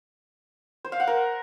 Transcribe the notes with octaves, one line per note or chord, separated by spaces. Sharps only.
C5
F5
F#5
A#4